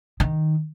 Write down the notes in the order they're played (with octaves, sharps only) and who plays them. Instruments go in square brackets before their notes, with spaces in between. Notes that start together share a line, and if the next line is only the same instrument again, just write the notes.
[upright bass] D#3